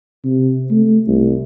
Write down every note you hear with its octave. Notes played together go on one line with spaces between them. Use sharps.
C3
A3
C2